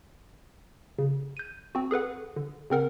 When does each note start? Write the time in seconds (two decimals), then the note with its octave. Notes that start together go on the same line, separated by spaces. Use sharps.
0.99 C#3
1.37 G6 D#7
1.75 C4 F#4
1.91 G#4 A4 B4 F#5
2.36 D3
2.70 C#3 C4 A#4 F#5